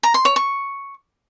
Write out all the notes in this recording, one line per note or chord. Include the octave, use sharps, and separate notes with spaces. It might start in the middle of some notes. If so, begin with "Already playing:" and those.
A#5
C6
C#5
C#6